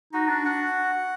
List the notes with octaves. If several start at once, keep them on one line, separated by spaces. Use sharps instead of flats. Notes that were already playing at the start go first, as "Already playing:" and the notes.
D#4 F#4
D4
D4 F#5